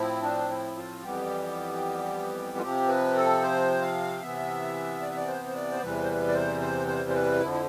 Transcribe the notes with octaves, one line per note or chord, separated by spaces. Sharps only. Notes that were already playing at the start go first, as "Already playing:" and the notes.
Already playing: A2 F3 C4 E4
D4
E4
F4
F2 E3 G3 B3 G4
F4
C3 F3 C4 G4
B4
A4
C5
F5
C3 E3 B3 E5
D5
E5
D5
C5
C5
D5
C5
E2 C3 E3 G3 B4
C5
B4
D5
C5
C5
C5
C5
B4
F2 D3 F3 E4
E4